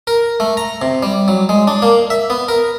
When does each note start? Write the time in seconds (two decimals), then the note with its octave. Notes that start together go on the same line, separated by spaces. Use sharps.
0.07 A#4
0.40 A3
0.57 A#5
0.82 C3
1.03 G3
1.28 F#3
1.49 G#3
1.67 D4
1.82 A#3
2.10 E5
2.30 B3
2.48 A#4